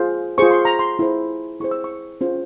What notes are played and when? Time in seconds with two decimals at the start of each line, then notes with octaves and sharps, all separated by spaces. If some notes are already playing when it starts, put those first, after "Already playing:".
Already playing: F4 G#4 C5
0.38 F4 G#4 C5 C#6
0.51 C6
0.65 A#5
0.79 C6
0.99 E4 G#4 C5
1.60 E4 G#4 C5 C#6
1.71 E6
1.84 C#6
2.21 C#4 F4 G#4 C5